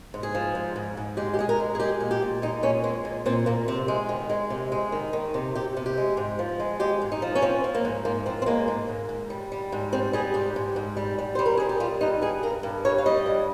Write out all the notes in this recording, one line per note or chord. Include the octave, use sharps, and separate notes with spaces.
G#2
G#4
F3
G#2
G#2
G#2
G#3 G4
G4
G#3 G#4
A#4
G#3
G#4
G#3 G4
A#2
G4
A#2
G#3 D#4
A#2 C#4
G#3 C4
A#2
A#2 C4
A#2 A#3
C3 C4
G#3
D#3
G#3
C3
G#3
D#3
D#3
C3
C3 G4
C3
G4
G#3
G#2
F3
G#3
G#3 G4
G#2
D#4
F3
C#4
F3 C4
F3
A#3
G#2
G#2 A#3
F3 C4
C4
G#3 A#3
G#2
G#2
G#2
G3
G3
G#2
G3 C4
G3 G#4
G#2 G4
G#2
G#2
G3
G3
G3 C5
A#4
G3 G#4
G4
G3 F4
G2 D#4
G2 G#4
G2 A#4
G2
G3 C#5
F5
G3 D#5
G2